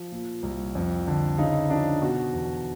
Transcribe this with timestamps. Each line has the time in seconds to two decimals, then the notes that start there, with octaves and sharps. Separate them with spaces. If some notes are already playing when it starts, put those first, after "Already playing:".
Already playing: F3
0.12 A#2
0.43 C2
0.75 F2
1.07 D3
1.38 C#3 D#4
1.70 F3 D4
2.02 B2 F#4
2.33 E2